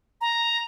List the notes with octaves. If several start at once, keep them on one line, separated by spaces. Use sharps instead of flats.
A#5